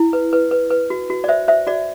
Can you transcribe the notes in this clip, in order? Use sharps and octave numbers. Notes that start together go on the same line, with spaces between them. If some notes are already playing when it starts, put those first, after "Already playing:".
Already playing: E4
B4
B4
B4
B4
F#4
F#4
D5
C5 E5
C5 E5
F#4 D5